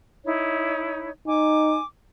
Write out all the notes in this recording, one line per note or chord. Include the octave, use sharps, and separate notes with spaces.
D#4 E4 C#5
D#4 G#5 D6